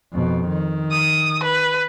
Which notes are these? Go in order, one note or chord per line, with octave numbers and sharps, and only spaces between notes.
F2 B2
D#3
D#6
B4